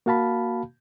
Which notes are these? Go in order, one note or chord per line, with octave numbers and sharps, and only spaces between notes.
A#3 F#4 F5 A5 B5